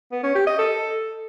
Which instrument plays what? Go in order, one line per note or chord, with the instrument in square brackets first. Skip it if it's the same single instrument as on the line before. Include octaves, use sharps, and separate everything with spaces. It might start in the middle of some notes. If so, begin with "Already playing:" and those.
[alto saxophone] B3
C#4
G4
D#5
A4